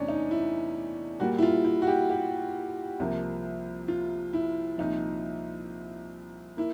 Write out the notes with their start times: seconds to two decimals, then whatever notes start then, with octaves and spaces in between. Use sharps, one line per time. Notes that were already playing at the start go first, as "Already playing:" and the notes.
Already playing: E2 C3 E3 A3 C#4 D4
0.08 D#4
0.31 E4
1.19 A#2 G3 A#3 F#4
1.38 E4
1.42 F4
1.65 E4
1.82 F#4
1.87 G4
2.10 G4
3.00 C2 C3 F3 A#3
3.88 F4
4.33 E4
4.78 C2 A#2 F3 D#4
6.57 A#3 E4